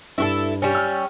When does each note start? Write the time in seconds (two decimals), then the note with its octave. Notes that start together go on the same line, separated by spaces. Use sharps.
0.18 G2 E4 F#4 A4
0.62 G3 C#4
0.75 E6 F6